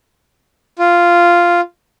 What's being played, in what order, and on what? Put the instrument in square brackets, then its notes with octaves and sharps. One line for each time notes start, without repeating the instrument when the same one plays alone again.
[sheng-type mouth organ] F4